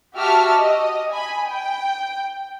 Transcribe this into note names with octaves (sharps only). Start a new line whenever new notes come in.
F#4 G4 E5 A5 E6 F6
D#5
G#5 B5
G5